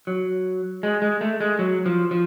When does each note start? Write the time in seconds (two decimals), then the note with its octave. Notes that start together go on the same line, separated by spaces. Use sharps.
0.07 F#3
0.83 G#3
1.02 G#3
1.21 A3
1.40 G#3
1.59 F#3
1.86 F3
2.11 F3